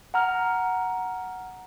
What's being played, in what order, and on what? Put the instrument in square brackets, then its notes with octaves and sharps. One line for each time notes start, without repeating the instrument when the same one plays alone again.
[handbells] F#5 A#5 F6